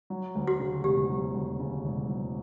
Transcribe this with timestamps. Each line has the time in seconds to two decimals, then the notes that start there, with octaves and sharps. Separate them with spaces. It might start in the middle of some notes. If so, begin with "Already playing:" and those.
0.10 F#3
0.35 D2
0.47 F#4
0.60 C#3
0.84 E1 G4
1.10 F#3
1.34 D2
1.59 C#3
1.85 E1
2.08 F#3